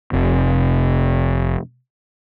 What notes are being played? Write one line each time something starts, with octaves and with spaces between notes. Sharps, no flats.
F1 C3